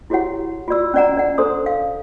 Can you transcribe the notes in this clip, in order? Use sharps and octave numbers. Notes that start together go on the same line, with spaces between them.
E4 F#4 G4 C#5 F#5
F4 F#4 D5 E6
C#4 D4 D5 F#5 A#5
D4 D5 F#5
D4 A4 A#4 C5 C6 D#6
F5